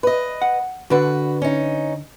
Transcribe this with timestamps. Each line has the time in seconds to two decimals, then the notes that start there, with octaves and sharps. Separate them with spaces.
0.03 B4 D#5
0.42 F#5
0.90 D3 D4 F#4 B4
1.42 C#4 D#4